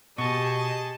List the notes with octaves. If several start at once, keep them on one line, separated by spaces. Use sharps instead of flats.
B2 G4 G#4 D#5 A5 C#6